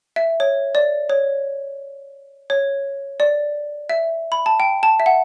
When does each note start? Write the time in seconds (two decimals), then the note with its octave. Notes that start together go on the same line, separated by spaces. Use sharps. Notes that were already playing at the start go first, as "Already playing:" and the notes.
0.16 E5
0.40 C#5
0.75 D5
1.10 C#5
2.50 C#5
3.20 D5
3.89 E5
4.32 B5
4.46 A5
4.60 G5
4.83 A5
5.00 E5
5.06 F#5